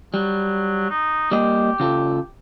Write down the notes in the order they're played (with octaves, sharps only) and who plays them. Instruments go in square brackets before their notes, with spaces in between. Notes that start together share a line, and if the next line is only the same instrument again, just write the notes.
[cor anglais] F#3 [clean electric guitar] G3
[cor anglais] D#4
[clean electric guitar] G3 A#3 D#5 [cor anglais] G4
[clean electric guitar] C#3 F4 A4